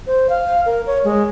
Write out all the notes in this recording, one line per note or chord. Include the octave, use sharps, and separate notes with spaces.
C5
F5
A#4
C#5
G#3